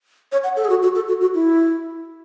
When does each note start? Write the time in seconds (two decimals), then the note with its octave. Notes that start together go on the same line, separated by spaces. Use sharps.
0.32 C#5
0.44 F#5
0.57 A4
0.65 G#4
0.70 F#4
0.83 F#4
0.95 A4
1.08 F#4
1.21 F#4
1.35 E4